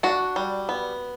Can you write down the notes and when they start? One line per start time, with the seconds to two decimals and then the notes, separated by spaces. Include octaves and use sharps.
0.03 D4 F#4
0.36 G3
0.69 B3